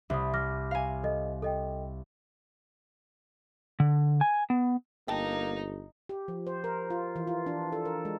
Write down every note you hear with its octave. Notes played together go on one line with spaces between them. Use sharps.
C2 E5 B5 D#6
D6 F6 A#6
F5 G#5
A4 D#5
A4 D#5 G5
D3
G#5
B3
G1 A#3 D#4 G5 A5
G4
F3
C5
A#4
F4
E3
F4
D4
A4
A#4
G#3